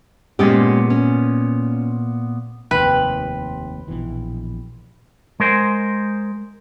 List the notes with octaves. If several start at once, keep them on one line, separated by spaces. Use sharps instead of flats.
A#2 G#3 B3 C#4 G4
C#4
F1 D#2 C3 B4 G5 B5 C6
A#1 B2 E3
G#3 A#4 C5